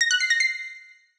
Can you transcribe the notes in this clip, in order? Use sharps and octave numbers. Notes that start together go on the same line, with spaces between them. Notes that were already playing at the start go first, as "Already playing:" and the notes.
A#6
F#6
C7
A#6
C7